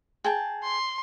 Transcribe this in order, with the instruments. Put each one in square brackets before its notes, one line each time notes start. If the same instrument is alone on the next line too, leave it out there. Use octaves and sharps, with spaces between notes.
[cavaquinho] G#4 G5 A5
[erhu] C6